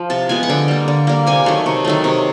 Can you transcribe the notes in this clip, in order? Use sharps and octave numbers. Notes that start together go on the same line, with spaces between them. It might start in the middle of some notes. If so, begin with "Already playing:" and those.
Already playing: F3
C3 A5
F3 G#3 B3 G#5
F#5
D3 G5
G3 A#3
D3
G3 A#3
C3 G#5
D#3 F#3 A3
C3
D#3 F#3 A3
C3